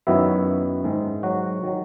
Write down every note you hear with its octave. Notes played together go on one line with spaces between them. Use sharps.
F#2 D#3 F#3 B3 E4 E5
G#2 D#3 G#3
F#3 F#4
D#3 F#3